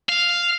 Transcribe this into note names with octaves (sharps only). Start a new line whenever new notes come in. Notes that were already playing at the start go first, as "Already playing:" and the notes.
F5